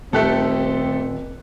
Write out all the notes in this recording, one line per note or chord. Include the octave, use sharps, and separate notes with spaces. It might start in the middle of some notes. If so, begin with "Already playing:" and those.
D#1 D#3 A3 A#3 C4 G4 A4 F#6